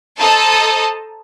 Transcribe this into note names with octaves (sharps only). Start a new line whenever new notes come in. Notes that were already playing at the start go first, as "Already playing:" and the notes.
A4 C5 D#5 A5 A#5 D#6